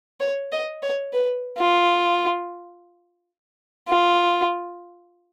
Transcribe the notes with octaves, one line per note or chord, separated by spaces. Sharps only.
C#5
D#5
C#5
B4
F4
F4